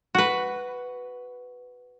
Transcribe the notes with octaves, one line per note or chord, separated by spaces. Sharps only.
F#4 B4